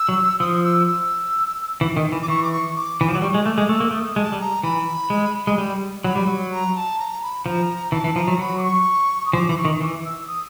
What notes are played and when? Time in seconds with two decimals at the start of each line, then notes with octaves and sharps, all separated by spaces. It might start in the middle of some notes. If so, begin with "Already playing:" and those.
Already playing: E6
0.09 F#3
0.40 F3 D#6
0.63 E6
0.87 E6
1.81 E3
1.97 D#3
2.12 E3
2.22 D6
2.28 E3 C#6
2.43 D6
2.51 C#6
2.75 D6
3.01 E3
3.08 F3
3.15 F#3
3.22 G3 C#6
3.34 G#3
3.41 C#6
3.45 A3 D6
3.58 G#3
3.69 A3 E6
3.80 A#3
3.91 A3 D#6
4.16 G#3 A5
4.32 G3
4.40 A#5
4.63 E3 B5
5.10 G#3
5.47 G#3
5.58 G3
6.04 F#3 B5
6.15 G3
6.27 F#3
6.51 A#5
6.75 A5
6.99 A#5
7.22 B5
7.45 F3 A#5
7.92 E3 A5
8.04 E3
8.16 F3 A#5
8.28 F#3
8.39 F#3 B5
8.57 D6
8.63 C#6
9.25 D#6
9.33 F3 D6
9.49 E3
9.57 C#6
9.65 D#3
9.81 E3 D6
10.05 E6
10.27 D#6